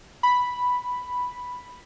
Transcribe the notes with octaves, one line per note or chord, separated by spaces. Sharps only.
B5